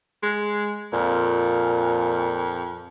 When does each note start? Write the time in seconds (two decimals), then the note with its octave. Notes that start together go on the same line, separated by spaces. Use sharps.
0.23 G#3
0.93 F2 A#2